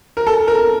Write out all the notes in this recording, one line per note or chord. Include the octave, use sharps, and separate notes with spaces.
A#4
A4
A#4